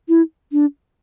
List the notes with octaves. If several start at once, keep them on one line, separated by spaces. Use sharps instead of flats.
E4
D4